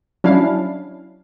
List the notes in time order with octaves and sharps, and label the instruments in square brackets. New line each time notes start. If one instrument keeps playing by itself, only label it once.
[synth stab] F#3 C#4 D4 E4 F5